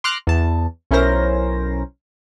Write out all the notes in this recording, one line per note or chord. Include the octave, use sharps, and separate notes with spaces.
C6 D6 F6 F#6 A#6
E2 A5
B1 C#4 E4 A#4 C5 A#6